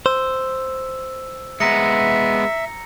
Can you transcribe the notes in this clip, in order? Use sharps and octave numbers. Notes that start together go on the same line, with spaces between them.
C5 E6
G#3 B3 E5 A#5 A#6 C#7